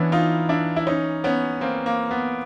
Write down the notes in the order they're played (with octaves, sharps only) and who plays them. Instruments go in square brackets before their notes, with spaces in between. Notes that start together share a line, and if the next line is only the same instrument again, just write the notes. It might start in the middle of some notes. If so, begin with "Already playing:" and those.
Already playing: [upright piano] E3 [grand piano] B3 C#4 D4 E4
[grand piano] D#4 F4
D4 E4
E4
C#4 D#4
B3 C#4
A#3 C4
A#3
B3